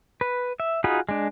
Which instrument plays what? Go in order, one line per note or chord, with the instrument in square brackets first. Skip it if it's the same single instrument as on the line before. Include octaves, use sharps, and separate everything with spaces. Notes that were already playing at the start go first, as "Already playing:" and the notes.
[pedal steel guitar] B4
E5
D#4 F4 F#4 G#4 B5
G#3 D4